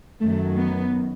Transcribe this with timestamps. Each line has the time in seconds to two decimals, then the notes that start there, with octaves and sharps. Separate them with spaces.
0.21 F#2 D#3 F#3 A3
0.59 B3